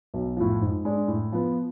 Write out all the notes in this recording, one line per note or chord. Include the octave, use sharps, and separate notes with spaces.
B1
A2 F3
G#2
G#3 D4
A2
F3 B3